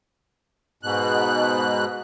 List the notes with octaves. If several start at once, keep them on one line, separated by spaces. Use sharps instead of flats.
G#2 B2 F#6